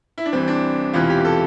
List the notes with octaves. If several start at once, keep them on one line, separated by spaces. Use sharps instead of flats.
E4
D4
C2 C3 E3 C4
D4
E1 E2 C3 E3 F4
G4
A4